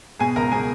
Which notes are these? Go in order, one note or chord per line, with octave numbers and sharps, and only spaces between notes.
B2 G#4 G#5
C#2 A#4 A#5
B2 G#4 G#5